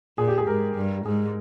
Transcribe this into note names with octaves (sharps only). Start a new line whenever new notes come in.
A#2 G#4
G4
G#4
G#2 A#4
G2
G#2 G#4